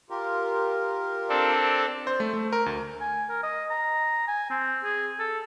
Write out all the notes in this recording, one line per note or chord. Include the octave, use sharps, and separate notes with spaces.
F4 G4 A#4
C4 D4 A4
C5
A3
A3
A#4
D2
G#5
A#4
D#5
A#5
G#5
C4
G#4
A4